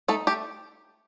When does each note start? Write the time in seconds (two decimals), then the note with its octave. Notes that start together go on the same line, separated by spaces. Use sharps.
0.08 A3 D#4 A4
0.27 A3 G4